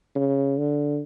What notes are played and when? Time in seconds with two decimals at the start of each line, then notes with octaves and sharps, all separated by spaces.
0.16 C#3
0.58 D3